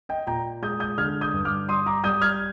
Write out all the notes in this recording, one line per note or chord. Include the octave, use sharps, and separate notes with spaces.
D#5 G5
A#2 G5 A#5
G#3 D#6 G6
D#6 G6
D3 F6 G#6
D#6 G6
G2
D6 F6
G3 C6 D#6
A#5 D6
G3 D#6 G6
F6 G#6